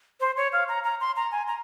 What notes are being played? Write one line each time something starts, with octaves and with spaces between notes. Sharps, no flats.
C5
C#5
F5
A#5
A#5
C6
A#5
G#5
A#5